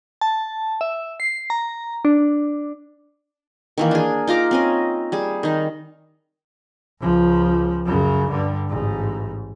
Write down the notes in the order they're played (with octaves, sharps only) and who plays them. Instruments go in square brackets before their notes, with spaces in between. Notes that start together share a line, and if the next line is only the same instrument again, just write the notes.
[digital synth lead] A5
E5
C7
A#5
D4
[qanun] D#3 E3 A#3
D4 G#4
D#4 F4 A#5 D6
C4 C#4 D#5
G3 G#4
D#3 D#4
[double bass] C#2 F3
F#2 C#3
G2 D3
A1 G#2